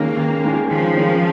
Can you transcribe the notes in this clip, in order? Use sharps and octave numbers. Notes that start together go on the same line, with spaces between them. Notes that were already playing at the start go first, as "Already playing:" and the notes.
Already playing: D#2 D#3 G#3 A#3 C#4
D#2
D#3 G#3 C#4
D#2 F3
D#3 G#3 C#4